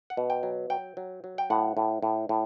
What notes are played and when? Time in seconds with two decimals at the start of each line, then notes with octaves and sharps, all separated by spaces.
0.10 F#5
0.17 B2
0.30 G5
0.43 F#3
0.70 F#3 G5
0.97 F#3
1.24 F#3
1.38 G5
1.50 A2 F#5
1.77 A2
2.03 A2
2.29 A2